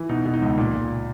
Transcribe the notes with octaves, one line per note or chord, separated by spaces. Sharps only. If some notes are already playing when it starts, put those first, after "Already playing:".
Already playing: E3
B2 D#4
B2
D#4
C#2
A#2
A#2